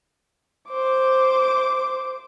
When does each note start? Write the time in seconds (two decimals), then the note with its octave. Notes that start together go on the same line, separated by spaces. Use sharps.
0.69 C5 D6